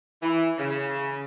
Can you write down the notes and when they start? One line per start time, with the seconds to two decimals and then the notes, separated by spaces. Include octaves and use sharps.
0.22 E3
0.58 C#3